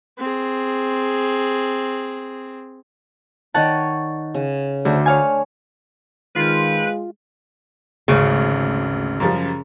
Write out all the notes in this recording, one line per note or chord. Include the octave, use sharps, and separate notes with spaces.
C4 G#4
D#3 C#5 D5 F#5 A5
C#3
D2 A3 C5
C#5 F5 G#5
D#3 G#3 C4 F4 B4
G#1 D2 C#3
F#2 F3 G3